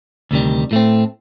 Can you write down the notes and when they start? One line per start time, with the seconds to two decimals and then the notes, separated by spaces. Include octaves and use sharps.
0.31 D2 C3 D#3 G3
0.71 A2 A3 C4